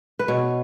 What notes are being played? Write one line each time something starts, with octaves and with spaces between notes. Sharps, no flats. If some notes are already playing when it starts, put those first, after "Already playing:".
B4
B2 C#5